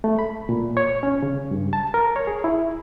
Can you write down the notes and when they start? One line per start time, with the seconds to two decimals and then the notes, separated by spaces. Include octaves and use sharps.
0.04 A3
0.19 B5
0.49 A#2
0.77 C#5
1.03 C#4
1.23 C#3
1.51 G2
1.73 A5
1.94 A#4
2.16 C#5
2.27 G#4
2.44 E4